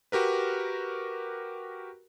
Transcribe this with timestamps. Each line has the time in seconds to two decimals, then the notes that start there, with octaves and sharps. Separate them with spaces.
0.12 F#4 G4 A#4 B4